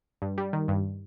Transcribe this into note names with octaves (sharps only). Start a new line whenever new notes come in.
G2
G3
D#3
G2